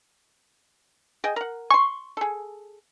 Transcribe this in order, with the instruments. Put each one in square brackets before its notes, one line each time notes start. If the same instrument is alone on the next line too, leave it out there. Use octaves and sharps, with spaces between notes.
[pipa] G#4 D#5 G5
A#4 F#5
[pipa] G#5 C6 [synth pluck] C#6
[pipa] G#4 A4